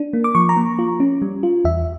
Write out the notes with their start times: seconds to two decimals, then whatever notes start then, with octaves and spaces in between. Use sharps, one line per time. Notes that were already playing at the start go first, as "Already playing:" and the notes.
Already playing: D4
0.13 A#3
0.24 D6
0.35 F3 C#6
0.49 A#5
0.57 A#3
0.79 F4
1.00 C#4
1.22 G3
1.43 F4
1.65 E2 E5